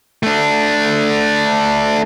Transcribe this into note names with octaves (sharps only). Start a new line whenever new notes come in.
A3 D4